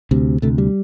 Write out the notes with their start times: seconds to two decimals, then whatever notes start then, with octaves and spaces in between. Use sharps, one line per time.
0.11 D2 C3
0.42 D2 C3 A3
0.58 G3